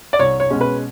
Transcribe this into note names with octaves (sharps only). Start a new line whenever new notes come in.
D5
C2 C#5
C#5
B2 G#3 C#4
B4